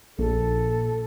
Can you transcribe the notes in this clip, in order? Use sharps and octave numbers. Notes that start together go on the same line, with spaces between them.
A#1 A4